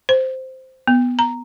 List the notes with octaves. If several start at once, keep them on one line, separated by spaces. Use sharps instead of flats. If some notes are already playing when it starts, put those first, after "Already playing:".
C5
B3
A#5